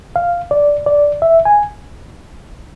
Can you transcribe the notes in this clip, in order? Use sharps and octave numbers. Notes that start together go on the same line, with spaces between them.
F5
D5
D5
E5
G#5